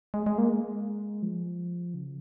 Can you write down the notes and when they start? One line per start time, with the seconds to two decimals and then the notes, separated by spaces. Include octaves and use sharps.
0.14 G#3
0.26 G#3
0.38 A#3
0.49 G#3
1.23 F3
1.94 C#3